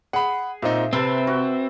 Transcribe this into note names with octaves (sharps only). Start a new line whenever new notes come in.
G#4 F#5 B5
A#2 C4 D#4 E5
C3 C4 A4 B4 E5
F#4